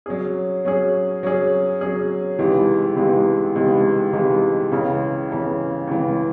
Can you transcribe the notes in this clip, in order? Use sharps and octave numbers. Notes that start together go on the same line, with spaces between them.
F#3 C#4 G#4
F#3 C#4 G#4
F#3 C#4 G#4
F#3 C#4 G#4
C#2 C3 E3 G#3 D#4
C#2 C3 E3 G#3 D#4
C#2 C3 E3 G#3 D#4
C#2 C3 E3 G#3 D#4
C#2 C#3 E3
C#2 C#3 E3
C#2 C#3 E3